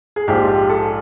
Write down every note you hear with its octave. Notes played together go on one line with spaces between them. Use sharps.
G#4
A#1 G#2 F3 G4
G4
A4